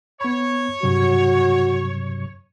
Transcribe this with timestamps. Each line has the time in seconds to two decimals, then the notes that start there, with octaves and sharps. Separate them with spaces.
0.21 B3 C#5 B5
0.83 G2 C3 F#3 F#4